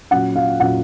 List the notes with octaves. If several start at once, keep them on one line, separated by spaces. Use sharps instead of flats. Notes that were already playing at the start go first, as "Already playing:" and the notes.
A#2 F#3 C#4 F#5
F5
A#2 F#3 C#4 F#5